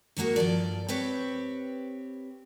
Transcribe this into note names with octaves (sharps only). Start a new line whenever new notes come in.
D#3 G#3 A#3 F#4 A#4
G2 F3 A4 D5
C4 G4 B4 C#5